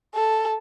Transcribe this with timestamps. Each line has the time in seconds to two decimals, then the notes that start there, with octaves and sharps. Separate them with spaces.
0.15 A4